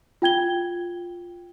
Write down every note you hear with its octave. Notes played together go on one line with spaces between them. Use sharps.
F4 G5 G#6 G7